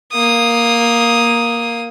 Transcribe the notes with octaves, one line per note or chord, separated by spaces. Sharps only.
A#3 D#6